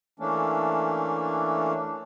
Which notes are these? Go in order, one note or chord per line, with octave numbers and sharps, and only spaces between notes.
E3 A3 A#3 C#4 D4